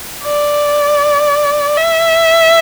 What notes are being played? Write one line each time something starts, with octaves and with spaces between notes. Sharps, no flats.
D5
E5